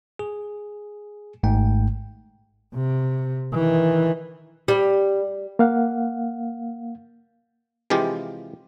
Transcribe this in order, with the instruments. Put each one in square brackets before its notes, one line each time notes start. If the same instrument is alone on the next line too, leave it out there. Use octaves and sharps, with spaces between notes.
[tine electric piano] G#4
G#1 G#2 A3 G5
[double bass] C3
D#3 E3
[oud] G3
[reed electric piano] A#3 F5 F#5
[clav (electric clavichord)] C3 E3 F3 G#3 F4 G4